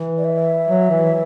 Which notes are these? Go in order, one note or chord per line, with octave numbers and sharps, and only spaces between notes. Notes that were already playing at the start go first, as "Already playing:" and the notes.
Already playing: E3
D5
E5
F#3
E3